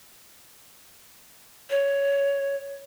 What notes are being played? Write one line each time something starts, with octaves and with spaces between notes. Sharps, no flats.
C#5